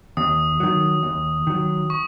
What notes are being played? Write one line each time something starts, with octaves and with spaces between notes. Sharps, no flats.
D#2 D#6
D#3 F#3
D#2
D#3 F#3
C#6